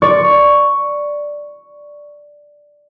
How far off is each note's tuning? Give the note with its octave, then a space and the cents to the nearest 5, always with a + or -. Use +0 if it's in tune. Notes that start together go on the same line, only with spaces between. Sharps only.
D5 +0 C#6 +5